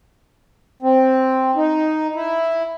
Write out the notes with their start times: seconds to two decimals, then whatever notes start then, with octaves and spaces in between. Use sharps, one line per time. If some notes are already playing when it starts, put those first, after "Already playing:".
0.82 C4
1.56 D#4
2.15 E4